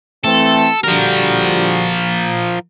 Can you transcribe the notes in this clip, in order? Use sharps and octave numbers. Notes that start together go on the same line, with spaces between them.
E3 A3 C4 A4
D3 F3 G3 F#4 A#4